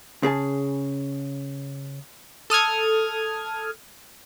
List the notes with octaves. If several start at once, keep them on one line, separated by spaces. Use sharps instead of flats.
C#3 G#4 A5
A4 D#6 F6 G#6